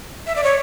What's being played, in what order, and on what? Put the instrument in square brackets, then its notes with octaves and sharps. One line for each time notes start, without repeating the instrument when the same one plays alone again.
[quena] E5
D5
C#5